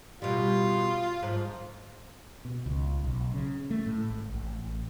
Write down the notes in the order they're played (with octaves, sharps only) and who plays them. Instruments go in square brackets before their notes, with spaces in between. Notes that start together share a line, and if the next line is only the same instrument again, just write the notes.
[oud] B2 G3 [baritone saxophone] F4
[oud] G#2 [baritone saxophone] F3
[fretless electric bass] B2
C#2
B1
C#3
A3
A2
G#1
A1